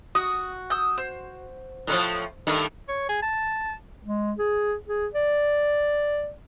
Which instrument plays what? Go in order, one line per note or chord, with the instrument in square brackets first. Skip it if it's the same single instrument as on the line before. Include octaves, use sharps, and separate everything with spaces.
[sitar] F#4 [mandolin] D#6
[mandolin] D#6 E6 G6
C5
[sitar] A2 D3 F3
G2 D#3 A3
[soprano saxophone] C#5
G#4
A5
[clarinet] G#3
G#4
G#4
D5